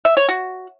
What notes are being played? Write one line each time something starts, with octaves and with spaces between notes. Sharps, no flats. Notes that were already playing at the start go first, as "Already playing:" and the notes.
E5
C#5
F#4